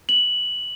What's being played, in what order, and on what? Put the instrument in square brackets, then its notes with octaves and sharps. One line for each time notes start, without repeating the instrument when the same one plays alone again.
[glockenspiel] F#7